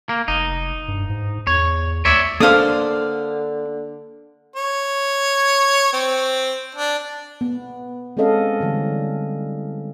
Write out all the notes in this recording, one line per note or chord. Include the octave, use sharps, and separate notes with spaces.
A#3
F1 D#4
G2
G#2
E2 C#5
D2 C#5 D5 E5
D3 A#3 D4 A4 C5 D5 F5 D#6
C#5
C4
D4
B3
G#3 C4 C#4 A4 D#5 F5
D3 E3 G3